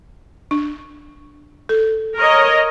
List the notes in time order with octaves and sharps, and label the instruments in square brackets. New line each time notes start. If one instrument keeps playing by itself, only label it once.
[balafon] D4
A4
[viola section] A#4 C#5 D#5